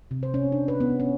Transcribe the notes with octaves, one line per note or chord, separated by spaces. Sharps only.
C3
C5
C#4
D4
B4
B3
C#4